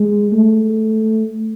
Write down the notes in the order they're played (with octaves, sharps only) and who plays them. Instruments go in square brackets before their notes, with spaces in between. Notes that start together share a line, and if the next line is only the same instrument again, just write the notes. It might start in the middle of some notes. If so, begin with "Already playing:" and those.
Already playing: [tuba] G#3
A3